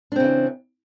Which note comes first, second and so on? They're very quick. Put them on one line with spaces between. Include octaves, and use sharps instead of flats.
D4 C4 C#3 E3